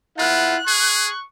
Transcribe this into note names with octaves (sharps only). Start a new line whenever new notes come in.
E4 F4 F#5 F#6
G#4 C#6